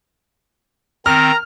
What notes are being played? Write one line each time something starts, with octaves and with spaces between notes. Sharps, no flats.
D#3 C4 A#5 F6